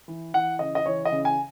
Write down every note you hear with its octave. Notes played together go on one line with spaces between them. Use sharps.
E3
E3 F#5
C#3 D#5
D#5
E3 C#5
D#5
C#3
G#5